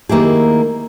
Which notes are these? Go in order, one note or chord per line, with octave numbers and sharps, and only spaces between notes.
D#3 A#3 E4 G4 G#4